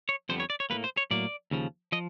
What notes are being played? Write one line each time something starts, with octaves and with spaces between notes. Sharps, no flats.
C#5
F2 D3 G3 B3 C5
C#5
D5
C#5
A2 F#3 A#3 B4
C5
C#5
A2 F#3 A#3 D5
D#2 C#3 F3
F3 D#5